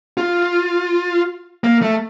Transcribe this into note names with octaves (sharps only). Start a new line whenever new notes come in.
F4
A#3
A3